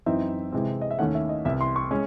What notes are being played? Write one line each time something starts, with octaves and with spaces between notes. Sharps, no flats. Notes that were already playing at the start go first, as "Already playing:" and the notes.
F#2 E3 C4 D#4 E5
C3 E3 G#3 C4
D#5
E5
D#2 D#3 A3 C#4 F#5
E5
D#5
C2 C3 E3 E5
C6
C#6
G#3 C#4